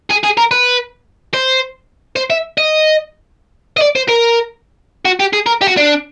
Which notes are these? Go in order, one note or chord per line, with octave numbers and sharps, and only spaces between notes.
G#4
G#4
A#4
B4
C5
C5
E5
D#5
D#5
D5
C5
A#4
F#4
G4
G#4
A#4
G4
F#4
D4